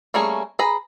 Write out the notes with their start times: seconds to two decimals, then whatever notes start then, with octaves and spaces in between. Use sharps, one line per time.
0.14 G3 A3 A#3 C#4 G#4
0.59 G#4 B4 A#5 B5